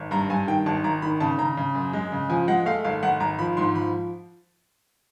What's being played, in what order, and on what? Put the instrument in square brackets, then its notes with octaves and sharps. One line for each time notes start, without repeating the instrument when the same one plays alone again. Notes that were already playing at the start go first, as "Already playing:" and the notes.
Already playing: [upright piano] G#1
G2 A#5
G2 G#5
D#3 G5
G#1 A5
G#1 A#5
D#3 B5
C#3 A5
C#3 A#5
C#3
F#2
G#3
C#3
F3 G#5
G#3 F#5
A3 F5
G#1 F5
G#1 F#5
G#1 A#5
F3 B5
G#2 C6
F3 B5